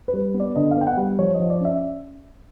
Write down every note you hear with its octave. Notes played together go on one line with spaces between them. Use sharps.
B4
G3
B3
D5
D3 D#5
F5
B3 G5
F#5
G3
F3 C#5
D#5
F3
D5
C#4 E5